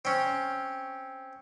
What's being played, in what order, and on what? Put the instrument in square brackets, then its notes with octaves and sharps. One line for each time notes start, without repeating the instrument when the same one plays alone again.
[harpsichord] C4 C#4